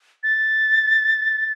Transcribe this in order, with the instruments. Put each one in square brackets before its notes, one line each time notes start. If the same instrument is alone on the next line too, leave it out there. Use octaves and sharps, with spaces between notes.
[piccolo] A6